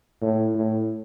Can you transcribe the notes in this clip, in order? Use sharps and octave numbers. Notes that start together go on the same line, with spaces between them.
A2
A2